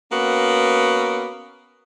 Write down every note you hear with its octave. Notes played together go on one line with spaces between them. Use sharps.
A#3 B3 C#4 F#4